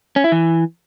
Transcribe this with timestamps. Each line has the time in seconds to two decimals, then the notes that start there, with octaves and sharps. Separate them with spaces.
0.16 C#4
0.24 E4
0.32 E3